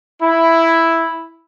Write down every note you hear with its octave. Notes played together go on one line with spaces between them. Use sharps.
E4